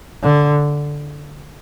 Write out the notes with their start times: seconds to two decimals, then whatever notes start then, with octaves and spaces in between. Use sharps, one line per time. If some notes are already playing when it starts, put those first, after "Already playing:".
0.23 D3